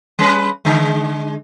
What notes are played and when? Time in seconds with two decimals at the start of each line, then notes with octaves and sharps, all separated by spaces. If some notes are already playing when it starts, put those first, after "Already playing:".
0.19 G3 C#4 B4
0.65 D3 G#3